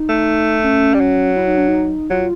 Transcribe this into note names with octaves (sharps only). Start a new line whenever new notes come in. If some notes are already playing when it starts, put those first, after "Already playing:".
Already playing: D#4
A3
C#4
G3
F#3
E4
D#4
D4
D#4
F#3 F4